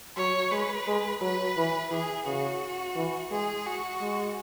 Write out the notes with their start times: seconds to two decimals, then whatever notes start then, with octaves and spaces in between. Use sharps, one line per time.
0.16 F#3 C#5
0.51 G#3 B4
0.87 G#3
1.21 F#3 B4
1.57 E3
1.91 E3 G#4
2.26 C#3 F#4
2.96 E3
3.31 G#3 G#4
3.66 F#4
4.01 G#3